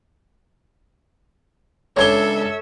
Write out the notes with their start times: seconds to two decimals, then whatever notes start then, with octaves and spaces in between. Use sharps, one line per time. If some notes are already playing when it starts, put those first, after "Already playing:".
1.97 C#2 D4 A4 C#5 E5 D6 G#6 G7